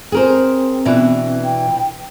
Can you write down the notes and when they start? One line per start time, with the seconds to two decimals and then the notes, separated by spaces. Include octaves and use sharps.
0.12 C4 G#4 A#4 C5
0.85 B2 E3 D4
1.44 G5